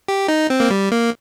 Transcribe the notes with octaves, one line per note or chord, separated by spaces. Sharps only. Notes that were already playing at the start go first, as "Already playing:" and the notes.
G4
D#4
C4
A#3
G3
A#3